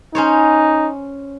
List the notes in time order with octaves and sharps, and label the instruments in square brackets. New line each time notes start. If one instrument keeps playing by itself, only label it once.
[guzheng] C#4 C5 C#5 [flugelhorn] D#4